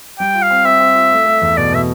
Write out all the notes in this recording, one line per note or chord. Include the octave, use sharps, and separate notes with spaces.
G3 G5
F4
F5
C4
C4 E5
C4
F4
A3
A3
E2
B2 D5
B2 E5